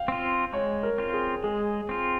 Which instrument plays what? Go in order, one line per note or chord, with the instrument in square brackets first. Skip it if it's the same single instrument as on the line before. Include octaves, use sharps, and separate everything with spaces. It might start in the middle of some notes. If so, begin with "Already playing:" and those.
Already playing: [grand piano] F5 G5
[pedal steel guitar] C4 F4
[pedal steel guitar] G#3 [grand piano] C#5
[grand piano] A#4
[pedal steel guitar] C4 F4
[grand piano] G#4
[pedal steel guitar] G#3 [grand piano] G#4
[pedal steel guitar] C4 F4